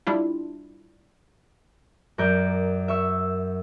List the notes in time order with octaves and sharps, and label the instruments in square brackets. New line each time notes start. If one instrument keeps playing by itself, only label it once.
[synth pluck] G3 D4 E4 F4
[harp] F#2 A#4 D5 G6
E5 C#6 E6